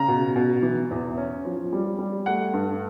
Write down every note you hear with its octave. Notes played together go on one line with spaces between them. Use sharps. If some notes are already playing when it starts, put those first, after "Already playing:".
Already playing: C#3 A#5
B2
B2
E3
E2
C#4
F3
G3
G3
A3 F#5
G2